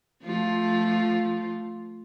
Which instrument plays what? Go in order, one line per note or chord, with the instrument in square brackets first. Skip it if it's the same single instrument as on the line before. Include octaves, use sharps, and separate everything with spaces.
[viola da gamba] F3 A3 F4